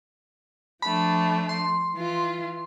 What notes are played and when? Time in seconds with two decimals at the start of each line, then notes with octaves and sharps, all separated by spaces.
0.82 F3 A3 D4 B5
1.49 C6
1.95 E3 F4